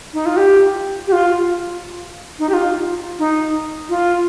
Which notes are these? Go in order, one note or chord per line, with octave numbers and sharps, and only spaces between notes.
D#4
F4
G4
G4
F4
D#4
G4
F4
D#4
F4